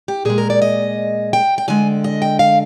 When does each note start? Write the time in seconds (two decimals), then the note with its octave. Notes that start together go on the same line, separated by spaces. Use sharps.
0.08 G4
0.25 A#2 G#3 G#4
0.38 A#4
0.50 D5
0.62 D#5
1.33 G5
1.58 G5
1.68 D3 G#3 G#5
2.04 D#5
2.22 G5
2.39 F5